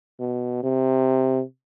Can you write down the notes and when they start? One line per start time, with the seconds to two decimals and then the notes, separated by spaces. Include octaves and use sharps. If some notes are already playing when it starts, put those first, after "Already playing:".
0.20 B2
0.63 C3